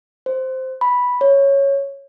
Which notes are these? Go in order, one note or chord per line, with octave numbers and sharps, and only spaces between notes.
C5
B5
C#5